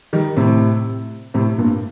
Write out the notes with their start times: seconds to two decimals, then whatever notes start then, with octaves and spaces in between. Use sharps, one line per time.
0.13 D#3 G3
0.37 A2 C3
1.34 A2 C3
1.58 G2 A#2